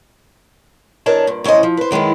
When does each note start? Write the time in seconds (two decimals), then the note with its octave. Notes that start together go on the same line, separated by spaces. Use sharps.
1.06 E2 D4 A#4 C#5 D#5 A5
1.27 G2 A#2
1.44 D2 C#4 E4 C5 D#5
1.63 F3
1.77 B4 C5
1.91 F#2 D#3 G#3 B3 E4